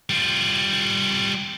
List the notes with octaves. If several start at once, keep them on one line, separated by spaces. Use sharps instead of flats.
G3 F4